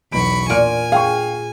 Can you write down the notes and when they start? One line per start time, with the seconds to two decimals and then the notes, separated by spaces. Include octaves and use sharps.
0.12 B1 E2 B2 B5 C#6 D7
0.50 A#2 G#5 F6 D7
0.92 G#4 F5 G5 C#6